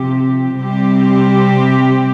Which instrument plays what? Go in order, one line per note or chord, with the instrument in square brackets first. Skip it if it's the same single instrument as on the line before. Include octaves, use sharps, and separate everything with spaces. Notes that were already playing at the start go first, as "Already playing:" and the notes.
Already playing: [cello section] C3 F3 C4 G4
C3 G3 C4 G4